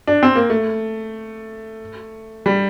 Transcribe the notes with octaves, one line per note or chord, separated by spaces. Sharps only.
D4
C4
A#3
A3
G3